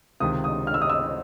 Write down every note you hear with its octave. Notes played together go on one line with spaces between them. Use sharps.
C#2 C3 D#3 D#6
D#6
F6
E6
D#6
E6